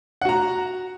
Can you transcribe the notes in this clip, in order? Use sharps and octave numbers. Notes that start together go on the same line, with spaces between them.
F#4 F#5 A#5